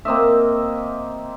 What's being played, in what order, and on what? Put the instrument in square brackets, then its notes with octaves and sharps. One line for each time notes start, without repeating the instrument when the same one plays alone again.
[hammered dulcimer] A#3 C4 D#5 E5